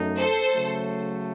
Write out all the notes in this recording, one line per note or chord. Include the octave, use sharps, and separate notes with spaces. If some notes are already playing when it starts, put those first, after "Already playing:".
Already playing: F#2 A3 D#4
A4 C5
C#3 F#3 A3